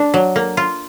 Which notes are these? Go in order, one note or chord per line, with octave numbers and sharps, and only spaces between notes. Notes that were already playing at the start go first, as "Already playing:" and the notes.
Already playing: D4
F#3
A#3
F4